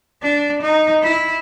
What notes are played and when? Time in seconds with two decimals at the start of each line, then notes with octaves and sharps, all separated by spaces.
0.22 D4
0.62 D#4
1.03 E4